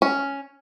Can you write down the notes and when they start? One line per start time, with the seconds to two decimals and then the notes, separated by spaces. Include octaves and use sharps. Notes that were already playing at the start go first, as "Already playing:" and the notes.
0.02 C#4